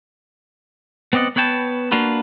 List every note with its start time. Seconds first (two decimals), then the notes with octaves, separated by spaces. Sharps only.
1.13 B3 C4 D5 D#5 F#5
1.36 B3 B4 C#5 G5 A5
1.91 A#3 D4 F4 F#4 B4